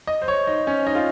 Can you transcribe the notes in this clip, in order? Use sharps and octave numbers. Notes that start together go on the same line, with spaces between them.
D#5
C5
C#5
D#4
C#4
D#4
F4